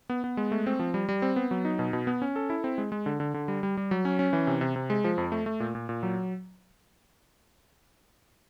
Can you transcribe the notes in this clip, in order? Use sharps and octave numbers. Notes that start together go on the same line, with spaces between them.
B3
B3
G#3
A3
C4
F3
G3
G3
C4
B3
F#3
D#4
B2
B2
B3
C#4
A4
E4
C4
G#3
G#3
D3
D3
D3
G3
G3
G3
F#3
C#4
C#4
E3
C3
C3
C3
G#3
F3
F2
A3
A3
A#2
A#2
A#2
F#3